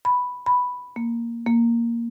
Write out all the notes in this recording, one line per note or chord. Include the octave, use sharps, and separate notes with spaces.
B5
B5
A#3
A#3